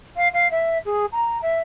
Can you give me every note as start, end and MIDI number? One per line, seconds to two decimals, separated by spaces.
0.16 0.28 77
0.33 0.48 77
0.51 0.78 76
0.85 1.06 68
1.12 1.38 82
1.42 1.60 76